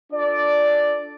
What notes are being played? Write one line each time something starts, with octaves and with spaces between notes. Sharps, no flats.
D4 F4 A4 D5